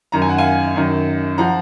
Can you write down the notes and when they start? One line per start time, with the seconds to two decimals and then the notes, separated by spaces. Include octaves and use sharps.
0.12 F#2 D#3 A#5
0.22 G#5
0.29 F#5
0.38 F5 G#5
0.76 F#2 D#3
1.38 F3 F#5 A#5